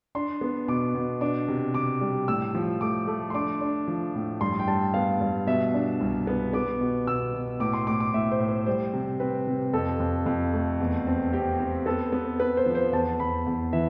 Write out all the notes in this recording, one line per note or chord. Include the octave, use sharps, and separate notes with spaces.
D4 C6
B3
B2 D6
B2
D4 D6
C3
C3 D6
G3
A2 E6
F3
A3 D6
A3
C6
D4 D6
D4
F3
A2
G2 C6
G5
G2 A5
B3 F5
G2
B2 E5
D4
C2
B3
B3 D6
B2
B2 E6
B2
A2 D6
C6
A2 D6
D6
A2 E5
C5
A2
C5
G3 C5
C3
C4 B4
C3
F2 A4
F2
F2
A3
E2
C4
C4 G4
C4
B3 A4
B3
B3 B4
C5
F3
C5
E2 A5
E2 B5
E2
E3 E5